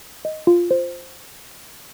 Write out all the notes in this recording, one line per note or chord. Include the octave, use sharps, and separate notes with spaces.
D#5
F4
C5